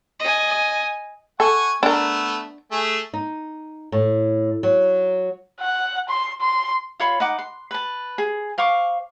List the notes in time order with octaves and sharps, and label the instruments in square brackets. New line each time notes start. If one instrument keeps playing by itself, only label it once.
[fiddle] D#5 G#5
[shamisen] A4 [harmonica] F#5 G#5 C#6
[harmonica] A3 B3 A4 [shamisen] D4 A#4
[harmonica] A3 G#4
[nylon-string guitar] D#4
A2
F#3
[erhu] F#5
C6
C6
[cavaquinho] F4 C#5 B5 C6
D#4 F#5 D6
C6
B4 A5
G#4
C5 F5 C#6 D6